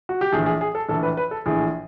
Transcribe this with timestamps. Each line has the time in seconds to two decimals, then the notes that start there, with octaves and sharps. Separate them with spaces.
0.09 F#4
0.21 G4
0.32 A#1 A2 E3 G#4
0.46 G#4
0.61 G#4
0.75 A4
0.89 A#1 A2 E3 A4
1.03 B4
1.17 B4
1.31 A4
1.46 A#1 A2 E3 G#4